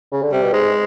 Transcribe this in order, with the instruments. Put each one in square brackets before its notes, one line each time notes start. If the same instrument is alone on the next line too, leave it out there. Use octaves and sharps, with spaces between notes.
[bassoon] C#3
D3
[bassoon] C3 [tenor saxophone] G3
[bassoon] B2
[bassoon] G#2 [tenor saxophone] G#3